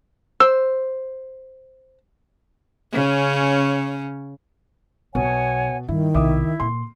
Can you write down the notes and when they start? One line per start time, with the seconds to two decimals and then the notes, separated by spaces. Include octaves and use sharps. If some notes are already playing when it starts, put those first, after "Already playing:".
0.40 C5 E6
2.93 C#3 C#4
5.15 B1 B2 C#5 F#5 G#5
5.88 G2 D#3 E4
6.14 B1 C3 E4 E5 D6 D#6
6.60 A#2 C6